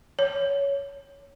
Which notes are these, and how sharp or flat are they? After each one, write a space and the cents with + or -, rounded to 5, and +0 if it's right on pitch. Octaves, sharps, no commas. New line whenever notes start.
C#5 +10